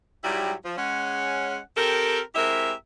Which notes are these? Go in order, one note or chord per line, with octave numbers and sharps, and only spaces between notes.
G#2 F#3 G3 E4 G4
F3
G#3 C#4 F#5
C4 G4 A4 A#4
G#3 C4 E4 G4 A#4 E5